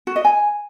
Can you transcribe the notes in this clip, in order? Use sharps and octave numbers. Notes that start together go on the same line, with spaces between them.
F#4
D#5
G#5